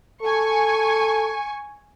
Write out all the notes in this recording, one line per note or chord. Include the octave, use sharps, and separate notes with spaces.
A4 G#5 C#6